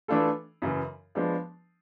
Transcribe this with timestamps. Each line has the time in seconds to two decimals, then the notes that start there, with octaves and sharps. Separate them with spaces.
0.08 E3 A3 D4 F4 A4
0.62 F#2 C#3 E3
1.15 F3 G#3 B3 D4